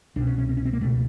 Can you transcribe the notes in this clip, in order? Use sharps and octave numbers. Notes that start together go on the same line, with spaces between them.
C2 B2 D4
C#4
C#4
C4
C#4
C4
A#3
C#2 B2 A3